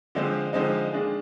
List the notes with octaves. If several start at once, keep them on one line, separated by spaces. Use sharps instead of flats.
D3 F3 G#3 C4
D3 F3 G#3 C4 D#4
D#3 G#3 D4 G#4